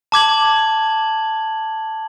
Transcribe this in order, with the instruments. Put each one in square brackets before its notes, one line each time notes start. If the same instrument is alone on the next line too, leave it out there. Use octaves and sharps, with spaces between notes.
[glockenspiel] A5 D6 G#6 F#7